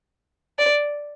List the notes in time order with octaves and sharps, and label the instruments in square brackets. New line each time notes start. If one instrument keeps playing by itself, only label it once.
[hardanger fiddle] D5